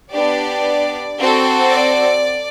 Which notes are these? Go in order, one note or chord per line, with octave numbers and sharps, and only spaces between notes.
B3 D4 G4 D5
C4 F#4 A4
D5